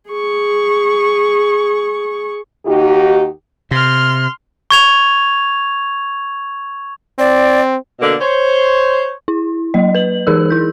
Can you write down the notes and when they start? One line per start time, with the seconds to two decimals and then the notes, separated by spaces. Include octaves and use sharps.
0.10 G#4 C#6
2.66 D#2 D#4 F#4 G4
3.71 C3 C6 F6
4.71 C#6 G#6 F7
7.19 C4 D5
8.00 B2 D3 A#3 D5
8.21 C5 C#5
9.28 E4
9.74 F#3 A#3 D#5
9.95 B4 F#7
10.27 E3 D#4 G#4 A#4 E6
10.50 E4 G6